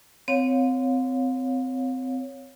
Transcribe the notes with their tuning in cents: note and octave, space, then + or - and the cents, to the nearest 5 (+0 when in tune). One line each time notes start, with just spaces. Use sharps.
C4 -25 C#5 +0 F5 +40